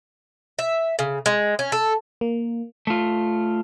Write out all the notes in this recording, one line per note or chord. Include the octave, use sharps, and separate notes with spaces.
E5
C#3
G#3
C#4
A4
A#3
A3 F4